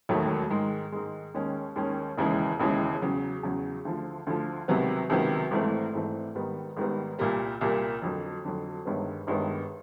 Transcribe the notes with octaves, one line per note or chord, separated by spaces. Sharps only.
E1 D#2 D#3 F#3 A3
G#2 D#3 G#3
G#2 D#3 G#3
D#2 D#3 G#3 C#4
D#2 D#3 G#3 C#4
E1 D#2 C#3 E3 G#3
E1 D#2 C#3 E3 G#3
E2 C#3 F#3
E2 C#3 F#3
D2 D3 F3
D2 D3 F3
C#2 C3 D#3 F#3 B3
C#2 C3 D#3 F#3 B3
G#1 G#2 E3 A3 C4
G#1 G#2 E3 A3 C4
G#1 G#2 D#3 G3 B3
G#1 G#2 D#3 G3 B3
C2 A#2 G3 A#3
C2 A#2 G3 A#3
F2 D3 F#3
F2 D3 F#3
G1 G2 D#3 G#3 B3
G1 G2 D#3 G#3 B3